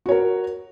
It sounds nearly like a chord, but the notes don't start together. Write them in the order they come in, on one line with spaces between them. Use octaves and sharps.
F#4 C#5 A#4